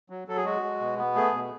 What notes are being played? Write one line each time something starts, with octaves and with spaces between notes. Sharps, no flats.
F#3
F#3 A4
G#4
G#3 F#4
G#3
B2
B3
A3 G#4
B2